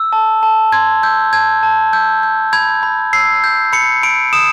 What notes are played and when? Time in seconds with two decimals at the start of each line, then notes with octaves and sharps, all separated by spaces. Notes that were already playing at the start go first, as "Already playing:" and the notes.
Already playing: E6
0.13 A5
0.43 A5
0.72 C6 G#6
1.03 E6 G6
1.33 A5 G#6
1.63 A5
1.93 E6 G6
2.23 G6
2.53 B5 G#6
2.83 B5
3.13 E6 C7
3.44 G6
3.73 B5 C#7
4.03 B5 D7
4.33 D#6 E7